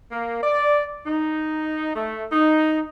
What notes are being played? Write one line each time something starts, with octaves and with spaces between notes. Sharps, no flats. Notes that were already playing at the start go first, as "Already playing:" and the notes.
A#3
D5
D#4
A3
D#4